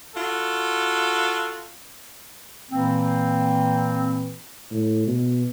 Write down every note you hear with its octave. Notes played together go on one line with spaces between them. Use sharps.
F4 F#4 A4
A#2 E3 A#3 C4
A2
B2